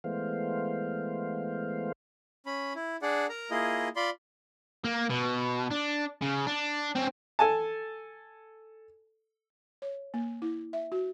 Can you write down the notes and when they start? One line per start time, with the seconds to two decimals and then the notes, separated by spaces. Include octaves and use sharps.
0.04 E3 G#3 A3 B3 C5 F5
2.46 C#4 B5
2.75 E4
3.02 D4 G#4 D5 F#5
3.29 A#4 A#5
3.51 A#3 E4 F4 G#4 D#5
3.96 F4 D5 B5 C6
4.85 A#3
5.10 B2
5.72 D4
6.22 C#3
6.47 D4
6.95 C4 C#4
7.39 A4 G#5 A5
9.82 C#5
10.14 A#3
10.42 E4
10.73 E5
10.92 F#4